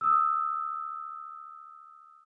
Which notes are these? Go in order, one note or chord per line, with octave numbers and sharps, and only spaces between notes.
D#6 E6